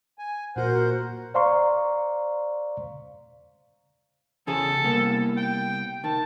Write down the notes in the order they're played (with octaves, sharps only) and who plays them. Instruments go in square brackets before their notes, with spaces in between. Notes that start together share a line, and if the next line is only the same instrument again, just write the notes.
[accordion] G#5
[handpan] A#2 F#4 [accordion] A#4 C5 F#5
[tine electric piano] C5 D5 F5 A#5 C6 C#6
[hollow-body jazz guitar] E2 C#3 G#4 [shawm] A4
[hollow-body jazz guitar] C2 A#3 B3
[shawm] G5
[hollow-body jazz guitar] D#3 [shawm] A5